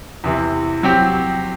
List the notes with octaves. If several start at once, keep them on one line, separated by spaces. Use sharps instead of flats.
E2 C3 E3
F#3 C4 G4